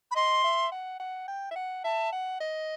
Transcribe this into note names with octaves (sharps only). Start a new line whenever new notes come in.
B5
D#5 C6
E5
F#5
F#5
G5
E5
F#5
E5 A5
F#5
D#5